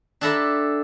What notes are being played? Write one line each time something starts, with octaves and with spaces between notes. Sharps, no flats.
D4 G4 A4 E5 A#5 B5